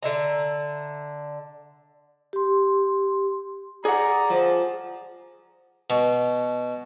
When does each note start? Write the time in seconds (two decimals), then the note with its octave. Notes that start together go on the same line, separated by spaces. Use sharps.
0.03 D3 E5 A#5
2.33 G4 C6
3.85 G#4 D5 F#5 A#5
4.30 F3
5.90 B2